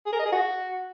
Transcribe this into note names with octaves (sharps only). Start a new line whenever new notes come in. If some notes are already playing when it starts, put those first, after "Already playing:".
G#4
A#4
D#5
G#4
F#4